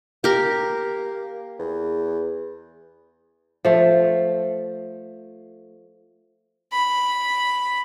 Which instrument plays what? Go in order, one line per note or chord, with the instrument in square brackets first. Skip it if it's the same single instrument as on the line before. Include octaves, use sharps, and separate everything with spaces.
[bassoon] A#3 [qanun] G4 A#4
[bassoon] E2
[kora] F3 A3
[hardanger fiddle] B5